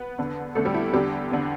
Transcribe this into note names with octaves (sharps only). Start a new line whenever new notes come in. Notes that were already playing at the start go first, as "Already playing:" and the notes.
Already playing: B3 B4
E2 D3
E2 D3 A3 A4
G3 G4
E4
E2 D3 G3 G4
E2 D3